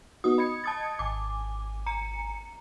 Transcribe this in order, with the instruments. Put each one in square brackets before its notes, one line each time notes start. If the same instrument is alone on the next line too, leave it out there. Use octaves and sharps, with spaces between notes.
[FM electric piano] B3 D#4 F#4 [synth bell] D#6
[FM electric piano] D#5 G#6 C#7 [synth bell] B5
[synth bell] A5 D#6 A6
[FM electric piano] G#1 G#5 [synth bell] D6
[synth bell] A#5 C#7